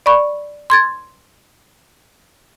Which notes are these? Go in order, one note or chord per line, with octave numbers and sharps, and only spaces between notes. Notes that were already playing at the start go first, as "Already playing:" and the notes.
D5 B5 C#6
C6 G#6 A6